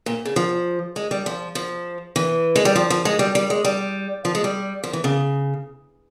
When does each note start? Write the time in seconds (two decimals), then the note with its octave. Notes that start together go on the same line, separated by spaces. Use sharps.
0.06 A#2
0.25 C#3
0.36 F3
0.96 G#3
1.11 G3
1.26 F3
1.55 F3
2.16 E3
2.56 G#3
2.65 G3
2.75 F3
2.90 F3
3.05 G#3
3.19 G3
3.35 G3
3.50 G#3
3.65 G3
4.25 F3
4.35 G#3
4.44 G3
4.84 F3
4.93 E3
5.04 C#3